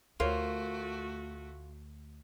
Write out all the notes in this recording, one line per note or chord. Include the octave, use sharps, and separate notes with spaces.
D2 A3 F4 F#4 A#4 C5 C#5